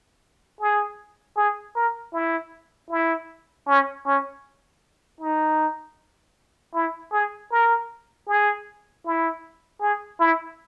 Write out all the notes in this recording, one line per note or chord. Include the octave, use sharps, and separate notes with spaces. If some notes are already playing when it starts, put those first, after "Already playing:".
G#4
G#4
A#4
E4
E4
C#4
C#4
D#4
E4
G#4
A#4
G#4
E4
G#4
E4